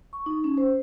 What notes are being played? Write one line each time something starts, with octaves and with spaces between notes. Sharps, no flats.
C#6
D#4
C#4
C5